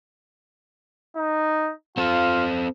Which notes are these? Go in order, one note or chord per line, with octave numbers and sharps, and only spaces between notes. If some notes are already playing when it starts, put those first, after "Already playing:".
D#4
C4 F4 A4